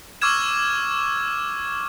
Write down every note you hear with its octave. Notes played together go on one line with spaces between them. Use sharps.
C#6 D6 E6 F6 G#6 E7